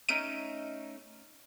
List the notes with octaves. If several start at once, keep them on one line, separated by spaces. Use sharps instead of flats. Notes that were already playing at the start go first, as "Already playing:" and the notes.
A3 C#4 D#4 D7 D#7